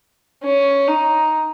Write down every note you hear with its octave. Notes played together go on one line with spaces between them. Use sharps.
C#4
D#4